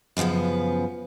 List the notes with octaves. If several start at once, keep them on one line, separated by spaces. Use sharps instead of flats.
F#2 C#3 E3 F3 B3